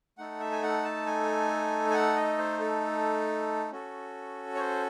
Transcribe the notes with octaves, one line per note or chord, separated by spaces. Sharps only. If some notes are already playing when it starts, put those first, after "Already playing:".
A3 D#4 A4 F#5
E5
G#5
F#5
A5
G#5
G#5
F#5
D#5
C5
A4
C#4 F#4 A4
C#5
C5